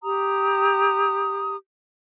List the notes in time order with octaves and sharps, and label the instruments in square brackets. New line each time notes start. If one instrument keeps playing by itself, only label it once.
[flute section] G4 A#5 D#6